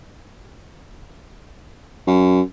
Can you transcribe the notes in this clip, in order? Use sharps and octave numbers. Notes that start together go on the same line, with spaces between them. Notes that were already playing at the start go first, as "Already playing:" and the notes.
F#2